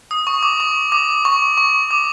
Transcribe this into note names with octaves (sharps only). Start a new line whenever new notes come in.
D#6
C#6
D6
C#6
D6
C#6
C#6
D6